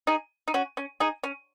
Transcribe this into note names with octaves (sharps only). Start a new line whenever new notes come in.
D#4 G#4
D#4
C#4 F#4
C#4
D#4 G#4
C#4